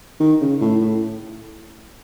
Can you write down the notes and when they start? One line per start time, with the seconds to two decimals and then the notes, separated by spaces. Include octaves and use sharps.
0.20 D#3
0.41 C#3
0.61 A2
0.81 A2